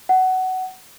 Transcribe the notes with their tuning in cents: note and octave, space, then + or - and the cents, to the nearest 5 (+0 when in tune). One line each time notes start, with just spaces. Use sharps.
F#5 +15